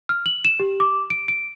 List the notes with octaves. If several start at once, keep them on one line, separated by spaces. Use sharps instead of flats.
F6
F#7
E7
G4
D6
D7
D7